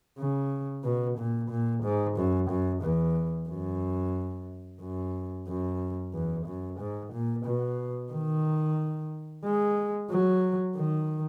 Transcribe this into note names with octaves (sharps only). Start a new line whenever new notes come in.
C#3
B2
A#2
A#2
G#2
F#2
F#2
E2
F#2
F#2
F#2
E2
F#2
G#2
A#2
B2
D#3
G#3
F#3
D#3